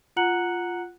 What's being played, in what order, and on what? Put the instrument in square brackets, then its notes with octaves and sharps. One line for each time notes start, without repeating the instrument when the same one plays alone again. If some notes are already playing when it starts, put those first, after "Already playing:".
[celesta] F4 F#5 A#5 F#6 C#7 F#7